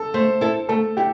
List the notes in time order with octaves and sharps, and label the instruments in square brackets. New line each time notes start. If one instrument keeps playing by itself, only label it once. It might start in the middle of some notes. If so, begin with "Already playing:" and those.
Already playing: [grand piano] A4
[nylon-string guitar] A3 [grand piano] C5
[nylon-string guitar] E4 A4
[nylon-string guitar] A3 [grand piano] A4
[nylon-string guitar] E4 [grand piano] G4